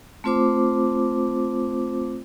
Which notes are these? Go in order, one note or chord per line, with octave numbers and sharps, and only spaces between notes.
A3 C4 F4 C5 D6